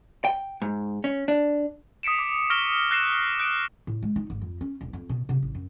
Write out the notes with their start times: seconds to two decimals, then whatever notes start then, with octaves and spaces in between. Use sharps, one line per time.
0.25 G5
0.62 G#2
1.04 C#4
1.28 D4
2.03 D#6 B6 C#7 D7 E7
2.19 D6
2.50 C#6 F6 A#6 D7 E7 G7
2.90 E6 F#6 A#6 C7 E7
3.40 F#6 D7
3.87 A2
4.03 G#3
4.16 D#4
4.30 G#1
4.42 F2
4.61 C#4
4.81 E1
4.93 F2
5.09 B2
5.29 C3
5.43 A1
5.55 F#2